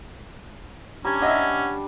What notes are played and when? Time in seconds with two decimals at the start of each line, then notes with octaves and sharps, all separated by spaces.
1.05 G3 C#4 D4 A#5 G#6
1.22 D#5 E5 F#5